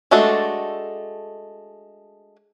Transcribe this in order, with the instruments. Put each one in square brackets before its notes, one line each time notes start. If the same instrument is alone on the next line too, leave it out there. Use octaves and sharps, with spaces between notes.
[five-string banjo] G#3 A3 D4 F#4 A4